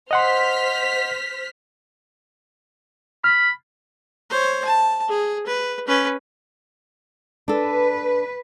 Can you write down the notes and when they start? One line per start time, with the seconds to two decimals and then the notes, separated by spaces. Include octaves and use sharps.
0.11 C5 D#5 F#5 C6 F6 B6
3.24 B5 F6
4.30 C5 C#5
4.64 A5
5.08 G#4
5.46 B4
5.87 C#4 B4
7.48 D4 A4 B4